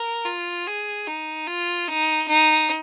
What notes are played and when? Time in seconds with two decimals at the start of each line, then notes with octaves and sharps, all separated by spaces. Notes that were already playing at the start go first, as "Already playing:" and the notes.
Already playing: A#4
0.25 F4
0.67 G#4
1.07 D#4
1.47 F4
1.88 D#4
2.28 D#4